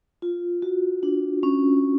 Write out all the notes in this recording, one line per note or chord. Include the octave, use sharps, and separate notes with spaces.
F4
F#4
D4
C#4